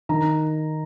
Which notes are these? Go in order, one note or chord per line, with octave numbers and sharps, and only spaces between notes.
D#3 A#5